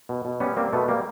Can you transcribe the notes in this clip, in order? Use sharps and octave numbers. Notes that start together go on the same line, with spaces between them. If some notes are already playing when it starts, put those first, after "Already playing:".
B2
B2
G3 B3 C#4
G3 A#3 C4
B2 A3 B3
G3 A#3